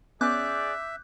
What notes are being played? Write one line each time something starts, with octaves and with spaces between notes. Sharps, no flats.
B3 C#4 G#4 D5 E5 D6 F#6 G6